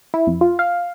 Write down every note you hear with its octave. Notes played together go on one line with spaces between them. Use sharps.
E4
F2
F4
F5